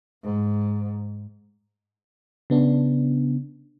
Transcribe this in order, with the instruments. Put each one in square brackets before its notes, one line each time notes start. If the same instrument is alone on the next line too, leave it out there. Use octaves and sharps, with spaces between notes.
[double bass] G#2
[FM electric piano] C#3 B3 D4